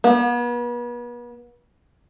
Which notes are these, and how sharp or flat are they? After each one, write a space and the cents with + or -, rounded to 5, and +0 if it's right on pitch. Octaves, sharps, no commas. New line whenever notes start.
B3 -40